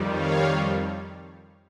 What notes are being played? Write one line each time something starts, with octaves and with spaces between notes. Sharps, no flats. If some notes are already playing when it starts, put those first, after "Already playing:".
Already playing: F2 D#3 G3
C#5 F5